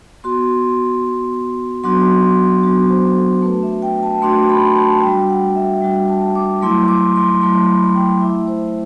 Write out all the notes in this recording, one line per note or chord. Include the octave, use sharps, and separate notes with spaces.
B3 F#4 C6
B3 F#4
F#3 B3 D4 F#4 C6
F#3 B3 D4 F#4
C5
A4
A3 D4 F#4 B4
E5
G5
A5
A3 D4 F#4 C6
B5
A5
G3 D4 F#4 G5
F#5
E5
G3 D4 F#4 G5
A5
D6
F#3 A3 E4 C6
D6
C6
F#3 A3 E4 C6
B5
G5
A3 E4 E5
C5